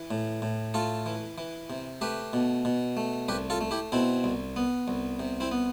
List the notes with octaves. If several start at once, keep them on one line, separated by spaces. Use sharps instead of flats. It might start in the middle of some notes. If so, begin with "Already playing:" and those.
Already playing: E3
A2
A2
A3 F4 A4
E3
E3
C3
A3 G4 B4
B2
B2
A3
C2 G4 B4
F4 A4
A3
E4 G4
B2 C4 E4
C2
B3
C2
C3
C4 E4
B3